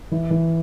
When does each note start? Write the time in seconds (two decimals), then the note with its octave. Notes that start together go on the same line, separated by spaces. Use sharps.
0.11 E3
0.30 E3